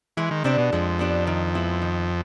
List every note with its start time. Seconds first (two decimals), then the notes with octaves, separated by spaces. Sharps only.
0.17 E3 G#3
0.31 D#3
0.44 C3 B3 D4 G4
0.58 B2
0.72 F2 G#3
0.99 B3 D4 G4
1.27 D#3
1.55 G#3 B3 E4
1.82 D#3